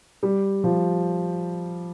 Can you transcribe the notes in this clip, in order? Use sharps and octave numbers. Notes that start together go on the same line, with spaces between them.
G3
F3